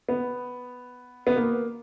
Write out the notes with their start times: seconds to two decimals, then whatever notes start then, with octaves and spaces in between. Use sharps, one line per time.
0.09 B3
1.27 B3
1.36 A#3